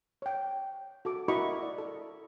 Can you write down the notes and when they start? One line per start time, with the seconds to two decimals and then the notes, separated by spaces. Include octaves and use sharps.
0.22 C#5 G5
1.05 F#4 A4 D6
1.28 E4 F#4 A#4 D#5 B5 C#6
1.62 D5
1.78 A4